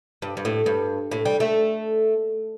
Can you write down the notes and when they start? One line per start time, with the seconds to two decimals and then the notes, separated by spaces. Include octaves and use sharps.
0.22 G2
0.37 G2
0.45 A2
0.66 G2
1.11 A2
1.25 G3
1.40 A3